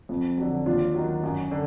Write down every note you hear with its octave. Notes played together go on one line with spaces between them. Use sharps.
F2
D3 F#3
D#2 D4 F4
D#3 F#3
F#2
D3